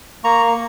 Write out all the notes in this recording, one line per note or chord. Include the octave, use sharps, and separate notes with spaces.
A#3 A#5 C#6